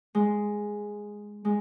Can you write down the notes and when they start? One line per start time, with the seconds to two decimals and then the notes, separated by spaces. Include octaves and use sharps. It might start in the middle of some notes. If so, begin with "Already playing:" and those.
0.15 G#3
1.45 G#3